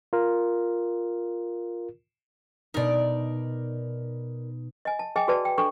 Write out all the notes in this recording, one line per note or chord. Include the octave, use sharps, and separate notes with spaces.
F4 A#4
B2 D#4 A#4 D5
D#5 G#5
A5
G#4 D#5 G5 G#5
F#4 G#4 B4 D5 A5
G5
D4 A4 G5 C#6